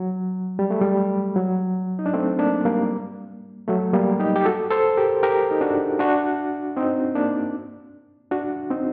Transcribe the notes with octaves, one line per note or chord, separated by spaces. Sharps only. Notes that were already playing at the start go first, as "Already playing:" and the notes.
Already playing: F#3
G3
A3
G3
F#3
D#4
D4
A3 C4
A#3 D4
G3 A#3
F#3 A3
G3 A#3
D#4 G4
G4
F#4 A4
A4 C5
G4 A#4
G4 A#4
D#4
D4 F#4
D4 F#4
C4 D#4
A#3 D4
D4 F#4
C4 D#4